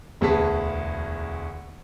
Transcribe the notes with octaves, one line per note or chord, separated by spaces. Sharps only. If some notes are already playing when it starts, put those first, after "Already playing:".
E1 D2 B3 G#4 A5 B6